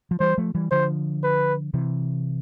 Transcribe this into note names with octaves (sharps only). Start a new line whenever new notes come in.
F3
E3 G3 C5
F3 A3
E3 G3
D3 F3 C5
B4
C3 E3